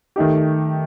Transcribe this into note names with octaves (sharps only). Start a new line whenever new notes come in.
D#3 A3 D#4 G4